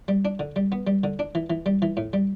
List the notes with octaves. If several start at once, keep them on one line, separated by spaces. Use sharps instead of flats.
G3
D4
D3
G3
B3
G3
D3
D4
E3
E3
G3
E3
A2
G3